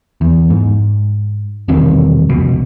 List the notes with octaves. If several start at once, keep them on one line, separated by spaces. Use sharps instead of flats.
E2
G#2
E1 C2 C3 D#3
F1 C#2 B2